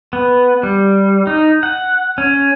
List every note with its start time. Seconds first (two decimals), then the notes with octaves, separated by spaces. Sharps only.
0.13 B3
0.63 G3
1.27 D#4
1.63 F#5
2.18 C#4